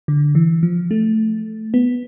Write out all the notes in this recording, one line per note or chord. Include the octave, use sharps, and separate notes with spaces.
D3
E3
F3
A3
B3